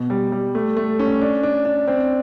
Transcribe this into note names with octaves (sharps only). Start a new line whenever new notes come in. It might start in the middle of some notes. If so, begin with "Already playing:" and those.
Already playing: B2
G3
G3
A3
A3
C#4
D4
D4
D4
C4